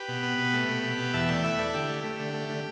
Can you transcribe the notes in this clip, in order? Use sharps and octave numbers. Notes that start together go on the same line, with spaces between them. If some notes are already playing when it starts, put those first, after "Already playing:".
Already playing: G4 B4
B2
B3
B2
A3
B2
B2
B2
E2 E5 A5
A3 D5 G5
E4 B4 E5
E4 A4 D5
D3 G4
A3
A3
D3
A3
D3